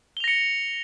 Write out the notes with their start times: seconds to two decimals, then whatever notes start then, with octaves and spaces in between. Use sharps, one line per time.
0.17 G7
0.20 F7
0.24 A#6
0.28 C#7